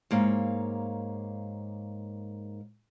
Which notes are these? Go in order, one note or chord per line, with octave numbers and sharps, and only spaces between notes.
G#2 A#3 C#5 F5